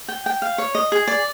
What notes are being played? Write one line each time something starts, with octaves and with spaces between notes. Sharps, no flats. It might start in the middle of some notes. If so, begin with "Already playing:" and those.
G5
G5
F5
C#5
D#5
G#4
D5